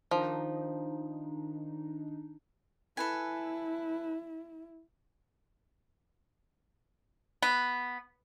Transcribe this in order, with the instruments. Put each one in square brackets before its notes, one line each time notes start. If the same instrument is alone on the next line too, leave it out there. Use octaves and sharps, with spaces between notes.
[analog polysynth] D#3 D4 D#4 [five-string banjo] F3
[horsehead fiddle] E4 [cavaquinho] A4 B4 G#5
[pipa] B3